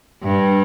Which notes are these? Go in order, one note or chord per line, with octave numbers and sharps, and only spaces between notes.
G2